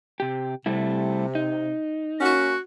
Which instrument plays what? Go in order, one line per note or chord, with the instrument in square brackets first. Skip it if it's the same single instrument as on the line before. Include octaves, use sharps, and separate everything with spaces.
[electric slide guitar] C3 G4
[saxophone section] C3 [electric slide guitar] G3 A3 E4
[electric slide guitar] D#4
[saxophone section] A#3 C#4 F#4